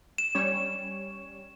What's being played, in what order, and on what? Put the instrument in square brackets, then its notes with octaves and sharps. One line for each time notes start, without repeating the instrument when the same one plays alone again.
[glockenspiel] E7
[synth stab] G3 C#4 C#5